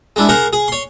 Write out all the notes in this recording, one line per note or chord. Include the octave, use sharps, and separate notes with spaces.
G#3 D4 E4
G#4 A#4 C5 F#5
G#4
C#5 C6